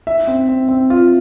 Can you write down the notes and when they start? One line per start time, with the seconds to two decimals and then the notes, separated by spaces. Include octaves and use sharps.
0.07 E5
0.27 C4
0.48 C4
0.68 C4
0.90 F4